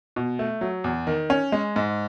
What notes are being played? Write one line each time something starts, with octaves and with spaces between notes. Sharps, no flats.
B2
A3
F#3
E2
D#3
C#4
G#3
G#2